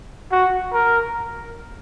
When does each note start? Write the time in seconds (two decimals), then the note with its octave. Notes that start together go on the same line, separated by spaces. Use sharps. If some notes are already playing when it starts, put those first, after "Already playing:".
0.31 F#4
0.73 A#4